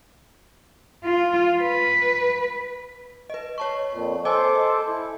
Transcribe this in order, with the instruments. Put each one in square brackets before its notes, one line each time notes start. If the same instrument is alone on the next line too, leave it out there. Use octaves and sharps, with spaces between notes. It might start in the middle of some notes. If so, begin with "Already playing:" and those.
[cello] F4
B4
[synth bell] B4 D#5
C#5 A5 C#6
[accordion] F2 A#2
[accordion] A4 C5 D6 [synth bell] D#5 G#5 A5
[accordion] E4